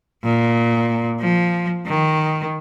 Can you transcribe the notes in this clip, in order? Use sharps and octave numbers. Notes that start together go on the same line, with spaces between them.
A#2
F3
D#3